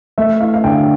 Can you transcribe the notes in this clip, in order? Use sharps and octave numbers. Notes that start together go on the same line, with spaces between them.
A3 E5
E4 F5
F5
D3 G5